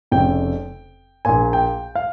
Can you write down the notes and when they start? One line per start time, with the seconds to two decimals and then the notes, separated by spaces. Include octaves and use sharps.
0.11 F1 F2 C#3 G5
1.25 A#1 A#2 G#5
1.53 G5
1.95 F5